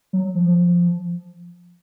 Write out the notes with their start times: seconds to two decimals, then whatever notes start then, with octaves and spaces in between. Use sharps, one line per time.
0.13 F#3
0.35 F3